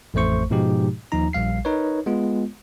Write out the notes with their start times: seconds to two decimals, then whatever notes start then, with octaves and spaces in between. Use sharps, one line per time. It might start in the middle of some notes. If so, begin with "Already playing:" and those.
0.14 A1 F2 A3 C5 C#6
0.50 G#2 B2 F3 G#3 D#4 G4
1.12 D#2 F3 D#4 A#5
1.33 A#1 G3 F5 C7
1.65 D#4 A#4 B4 C#5
2.06 G#3 B3 F4